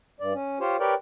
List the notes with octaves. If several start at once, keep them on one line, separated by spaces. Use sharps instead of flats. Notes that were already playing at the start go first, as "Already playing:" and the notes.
G2 D5
C#4
F4 G4 C5 C#5
G4 A#4 B4 C#5 D5 G5